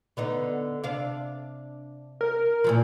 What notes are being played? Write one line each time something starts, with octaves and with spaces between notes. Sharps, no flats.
D3 B3 D#4
C3 D4 F5
A#4
A#2 E3 F3